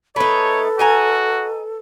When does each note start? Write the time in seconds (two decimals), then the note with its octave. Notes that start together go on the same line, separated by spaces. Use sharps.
0.16 A3 D#4 A4 B4 C#5 B5
0.79 F#4 D#5 G#5 A#5